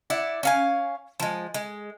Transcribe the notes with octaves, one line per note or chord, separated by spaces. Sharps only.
E4 D5 F#5
C#4 F5 G#5
F3 G#3
G#3